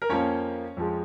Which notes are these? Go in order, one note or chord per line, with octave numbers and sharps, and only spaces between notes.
A#4
F2 F3 A#3 C#4 C#5
F2 F3 G#3